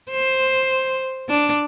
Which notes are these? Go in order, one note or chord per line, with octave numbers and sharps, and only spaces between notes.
C5
D4